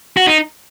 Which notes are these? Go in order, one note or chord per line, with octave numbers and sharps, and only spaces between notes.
F#4
D#4